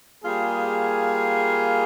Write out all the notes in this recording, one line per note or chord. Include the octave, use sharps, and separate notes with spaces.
G3 A#3 F4 G#4